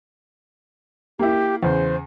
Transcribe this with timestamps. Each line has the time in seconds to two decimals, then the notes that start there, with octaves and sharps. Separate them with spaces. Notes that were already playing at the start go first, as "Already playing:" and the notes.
1.19 A#3 E4 G4
1.63 E2 C#3 C5